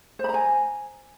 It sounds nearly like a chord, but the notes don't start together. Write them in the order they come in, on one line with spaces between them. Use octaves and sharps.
C5 B5 A#5 G#5